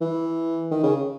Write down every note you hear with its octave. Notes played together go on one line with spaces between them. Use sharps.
E3
D#3
C#3